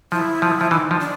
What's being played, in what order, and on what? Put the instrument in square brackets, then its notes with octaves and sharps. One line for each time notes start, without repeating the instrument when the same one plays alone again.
[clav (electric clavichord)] F3 [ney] E4
[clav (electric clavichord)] F3
F3
[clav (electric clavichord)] E3 [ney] D#4
[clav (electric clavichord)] F3
[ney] D4